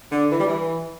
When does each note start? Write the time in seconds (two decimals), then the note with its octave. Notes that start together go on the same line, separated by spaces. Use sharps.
0.12 D3
0.32 E3
0.40 G3
0.47 E3